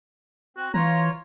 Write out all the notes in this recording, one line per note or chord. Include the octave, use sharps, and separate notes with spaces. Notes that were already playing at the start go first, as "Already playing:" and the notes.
C4 F#4
E3 F4 C#5 A#5